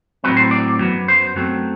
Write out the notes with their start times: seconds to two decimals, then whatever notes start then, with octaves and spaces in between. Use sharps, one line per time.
0.24 A2 F#3 C4 B4
0.37 C5
0.51 D5
0.79 F#2 F#3 B3
1.08 C5
1.36 F#2 F#3 A3 C4